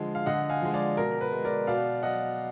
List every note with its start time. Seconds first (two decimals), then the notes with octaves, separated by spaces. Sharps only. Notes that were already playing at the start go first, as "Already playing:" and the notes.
Already playing: D3 F3 G#3
0.15 F5
0.26 D3 D#5 F#5
0.50 F5 G#5
0.61 F3 G#3
0.74 D5 F5
0.97 B2 A#4
1.21 B4
1.32 G#3
1.45 A#4 D5
1.67 B2 D5 F5
2.03 F#3 D#5 F#5